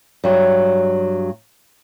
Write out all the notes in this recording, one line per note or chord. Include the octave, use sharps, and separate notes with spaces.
G2 F#3